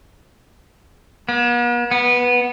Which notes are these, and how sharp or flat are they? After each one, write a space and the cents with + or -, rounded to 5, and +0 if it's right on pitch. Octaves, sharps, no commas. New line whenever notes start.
B3 -45
B3 -10